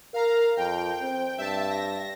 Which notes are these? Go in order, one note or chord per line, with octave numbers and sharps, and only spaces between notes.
A#4 F5 A#5
F2 G5
C4
G2 E5 A5
A#6